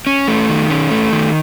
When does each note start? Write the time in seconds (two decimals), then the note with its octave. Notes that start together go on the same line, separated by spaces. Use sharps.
0.07 C#4
0.27 A3
0.49 D#3
0.70 C#4
0.91 A3
1.12 D#3